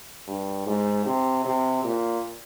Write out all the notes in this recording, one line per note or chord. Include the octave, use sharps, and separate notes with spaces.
G2
G#2
C3
C3
A#2